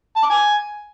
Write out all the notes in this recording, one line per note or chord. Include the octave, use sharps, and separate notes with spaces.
A5
D6
G#5